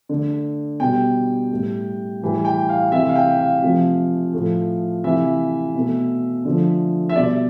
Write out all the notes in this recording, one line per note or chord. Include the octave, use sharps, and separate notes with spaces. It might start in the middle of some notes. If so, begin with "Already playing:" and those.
D3 A3
B2 G3 G5
A2 G3
A2 E3 G3
G5
F5
C3 E3 A3 E5
F5
G5
F5
C3 F3 A3
A2 F3 A3
C3 E3 A3 E5
B2 A3
D3 F3 A3
E5
B2 G3 D5